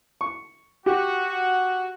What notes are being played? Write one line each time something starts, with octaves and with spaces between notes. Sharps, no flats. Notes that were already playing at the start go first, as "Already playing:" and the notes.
C#6
F#4 G4